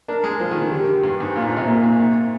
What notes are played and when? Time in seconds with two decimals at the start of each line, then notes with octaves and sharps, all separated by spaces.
0.08 D4 A#4
0.24 G#3
0.40 F3
0.51 D#3
0.62 D#3
0.71 D3 G4
1.04 G2
1.20 G#2
1.26 G4
1.35 A#2 F4
1.42 G#2
1.46 A#2 D4
1.57 C3 C4
1.67 A#2 A#3
1.84 G#2
2.00 G#2